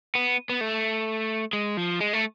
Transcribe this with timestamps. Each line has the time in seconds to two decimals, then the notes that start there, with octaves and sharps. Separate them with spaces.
0.15 B3
0.49 B3
0.61 A3
1.53 G#3
1.77 F3
2.00 G#3
2.13 A3